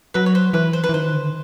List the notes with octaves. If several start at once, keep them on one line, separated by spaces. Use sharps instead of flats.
F#3 B4
C#5
C5
E3 B4
C5
B4
E3
D#3 C5
D3